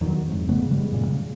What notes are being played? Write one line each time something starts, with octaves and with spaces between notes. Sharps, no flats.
E2 D#3 E3 F#3
F2 G#2
G#2 C#3 A3 B3
C#3 E3 G3 G#3
F#2 A#2
C#3